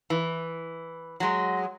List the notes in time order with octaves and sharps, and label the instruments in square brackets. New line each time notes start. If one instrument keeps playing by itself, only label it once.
[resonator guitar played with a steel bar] E3
F#3 G#3